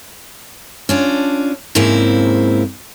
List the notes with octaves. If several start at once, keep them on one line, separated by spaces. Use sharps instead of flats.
C#4 D4 F4
G#2 C#3 A#3 C4 E4